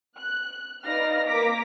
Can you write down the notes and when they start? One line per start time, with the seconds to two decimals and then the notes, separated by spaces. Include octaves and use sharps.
0.17 F#6
0.86 D#4 B4 D5 F5 F6 A#6
1.30 A#3 A#5 D6 A#6 B6